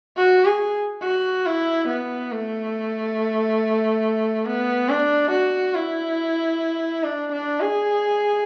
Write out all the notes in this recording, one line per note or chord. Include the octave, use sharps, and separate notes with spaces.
F#4
G#4
F#4
E4
B3
A3
B3
D4
F#4
E4
D4
D4
G#4